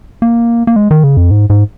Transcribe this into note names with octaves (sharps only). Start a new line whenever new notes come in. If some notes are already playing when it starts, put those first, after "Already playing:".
A#3
A#3
G#3
D#3
C#3
F2
G#2
G#2